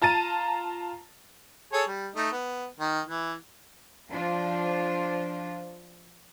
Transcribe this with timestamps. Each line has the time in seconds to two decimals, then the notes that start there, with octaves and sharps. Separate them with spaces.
0.02 F4 A5 A#5 A6 D#7
1.73 G#4 A4 C#5
1.87 G3
2.16 A3 D#4 D#5
2.32 B3
2.80 D#3
3.06 E3
4.10 F3 D4 F4 C5